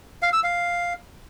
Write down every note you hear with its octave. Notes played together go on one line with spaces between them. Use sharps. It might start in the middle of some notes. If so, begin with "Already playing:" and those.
F5
E6
F5